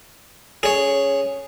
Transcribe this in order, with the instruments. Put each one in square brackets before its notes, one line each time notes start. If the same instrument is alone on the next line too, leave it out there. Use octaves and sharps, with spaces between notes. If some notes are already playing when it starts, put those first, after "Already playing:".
[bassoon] C#4 [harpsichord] G#4 C#5